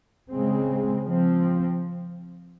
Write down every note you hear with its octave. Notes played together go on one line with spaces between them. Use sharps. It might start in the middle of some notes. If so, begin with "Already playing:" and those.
C#3 G#3 C4
F3 C4